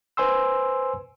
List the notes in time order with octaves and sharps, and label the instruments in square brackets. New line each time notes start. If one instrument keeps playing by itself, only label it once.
[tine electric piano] B4 C5 G#5 C6 E6